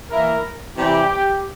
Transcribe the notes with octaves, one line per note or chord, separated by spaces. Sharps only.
E3 A#3 E4 A#4
C3 E3 G3 G4